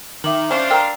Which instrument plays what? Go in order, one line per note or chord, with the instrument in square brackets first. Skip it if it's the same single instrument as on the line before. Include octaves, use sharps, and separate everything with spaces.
[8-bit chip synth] D#3 [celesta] E5 D6 F#7
[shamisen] C#4 C#5 A5 [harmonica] D4 F5 [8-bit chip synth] C5
[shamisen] A#4 D#5 G5 [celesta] A#5 E6